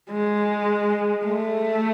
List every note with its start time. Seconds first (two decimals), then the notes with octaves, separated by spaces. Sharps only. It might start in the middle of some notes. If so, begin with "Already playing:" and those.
0.11 G#3
1.24 A3